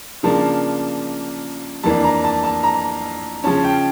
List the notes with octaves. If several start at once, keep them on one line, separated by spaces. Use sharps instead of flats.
C#3 F3 A#3 D4 A5
F2 E3 A#3 D4 A5
A#5
A5
A5
A#5
C#3 F3 C#4 A5
G5